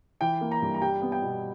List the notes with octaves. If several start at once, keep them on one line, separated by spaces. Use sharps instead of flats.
E3 G5
A#3
A#5
G2
A#5
G3 G5
B3
G5
B2